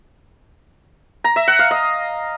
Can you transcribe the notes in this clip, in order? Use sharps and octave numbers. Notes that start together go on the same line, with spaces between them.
A#5
E5
F#5
F5
D#5